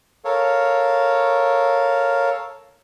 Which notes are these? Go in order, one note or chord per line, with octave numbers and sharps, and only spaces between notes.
A4 A#4 C#5 F5